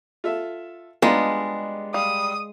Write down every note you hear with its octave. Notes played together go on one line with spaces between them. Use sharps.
F4 A4 E5
G3 G#3 B3 D4 D#4 F4
G3 F5 D#6